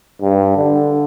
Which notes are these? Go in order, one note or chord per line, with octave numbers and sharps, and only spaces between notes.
G2
D3